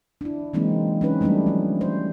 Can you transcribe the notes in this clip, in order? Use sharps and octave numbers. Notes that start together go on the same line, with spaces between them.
D4 E4
E3 F#3 G#3 A#3 C4 D#4
C#4 D#4 B4
F#3 G3 A3 C#4 D4
F3 A3
C5